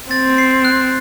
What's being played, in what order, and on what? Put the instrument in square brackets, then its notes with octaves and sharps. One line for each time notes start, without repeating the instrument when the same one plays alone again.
[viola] C4 [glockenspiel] A6
[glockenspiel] C7
F#6